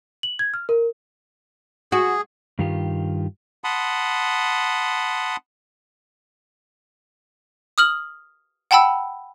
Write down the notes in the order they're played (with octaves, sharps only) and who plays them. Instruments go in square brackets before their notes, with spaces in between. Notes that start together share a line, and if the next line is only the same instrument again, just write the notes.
[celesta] F#7
G#6
F6
A#4
[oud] F#4 [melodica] G#4
[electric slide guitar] G2 D#3 F4 G4
[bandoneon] F#5 A5 B5 C6 D#6
[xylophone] D#6 F6 F#7
F#5 G5 A5 B5 E6